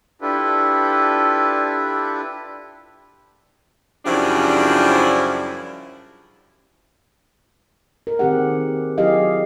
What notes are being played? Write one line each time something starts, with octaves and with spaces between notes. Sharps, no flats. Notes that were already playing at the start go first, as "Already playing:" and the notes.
D4 E4 F4 G4 A4 B4
F#2 C#3 F3 G3 D4 E4
A#4
D#3 C4 G4 G#4 F#5
F#3 E4 G4 G#4 D#5 F5